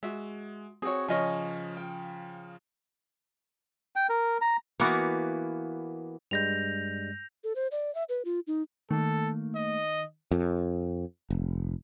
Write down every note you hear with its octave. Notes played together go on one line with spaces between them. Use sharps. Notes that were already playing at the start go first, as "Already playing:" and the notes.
G#3 F#4 E5
C4 F#4 G#4 C#5
C#3 F3 C#5 D#5 G#5 F6
G5
G5
A#4
A#5
E3 A#3 B3 F#4
G2 G3 G#3 G6 A#6 F7
A4
C5
D5
E5
B4
F4
D#4
D#3 A3 A#3 A4
D#5
F2
F1